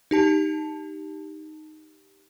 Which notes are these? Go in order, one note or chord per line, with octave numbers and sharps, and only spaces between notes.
D#4 G4 A5